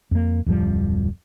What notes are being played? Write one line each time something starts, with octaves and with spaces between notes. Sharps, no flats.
F2 A#3
D1 F2 F3 G3